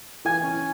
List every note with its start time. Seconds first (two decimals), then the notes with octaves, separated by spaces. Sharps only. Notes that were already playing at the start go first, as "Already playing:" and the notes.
0.25 E3 G#5
0.44 C#4